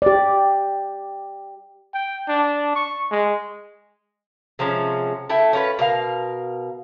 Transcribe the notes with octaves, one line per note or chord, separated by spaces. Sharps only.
G4 D5
G5
D4
C#6
G#3
C3 F3 G#3 C#4
A3 E4 G5
C#4 F4 A#4 B4
B2 A#4 F5